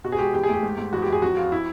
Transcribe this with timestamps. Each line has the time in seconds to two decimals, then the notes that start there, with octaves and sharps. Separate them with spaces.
0.04 B2 F#4
0.12 G#4
0.19 G#3 G4
0.34 E2 G4
0.43 G#4
0.49 A3 G4
0.63 G#2
0.78 G#2
0.93 E2 F#4
1.02 G4
1.08 E2 G#4
1.22 F2 F#4
1.37 F2 F4
1.52 E4